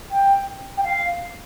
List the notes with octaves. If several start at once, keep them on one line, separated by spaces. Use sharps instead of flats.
G5
G5
F5